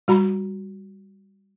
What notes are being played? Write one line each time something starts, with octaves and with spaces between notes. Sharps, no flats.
G3 F#4 A#5 B5